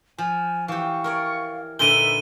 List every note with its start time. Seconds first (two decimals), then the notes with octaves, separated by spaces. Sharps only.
0.18 F3 G#5
0.68 E3 G4 F5 C#6
1.04 A#4 C#5 D5
1.79 A#2 D3 D4 D#4 B4 E5 D#7 G7